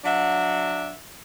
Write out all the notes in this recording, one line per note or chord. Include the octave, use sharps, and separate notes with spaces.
F#3 D4 E5 F#5